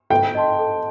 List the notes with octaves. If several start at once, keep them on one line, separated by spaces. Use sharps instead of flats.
A4 G5
D#5 A5 C6
A4